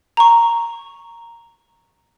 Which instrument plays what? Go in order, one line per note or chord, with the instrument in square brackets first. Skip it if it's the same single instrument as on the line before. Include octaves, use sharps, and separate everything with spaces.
[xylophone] A#5 C#6